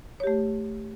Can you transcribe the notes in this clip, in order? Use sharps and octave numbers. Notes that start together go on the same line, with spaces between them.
A3 G4 C#5